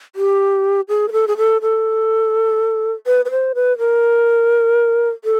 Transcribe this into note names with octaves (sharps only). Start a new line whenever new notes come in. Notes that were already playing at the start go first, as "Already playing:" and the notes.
G4
G#4
A#4
A4
G#4
A4
A4
B4
B4
C5
B4
A#4
A4